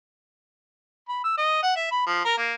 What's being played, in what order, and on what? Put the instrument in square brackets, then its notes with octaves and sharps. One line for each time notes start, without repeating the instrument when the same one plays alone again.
[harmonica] B5
E6
D#5
F#5
E5
B5
F3
A#4
A#3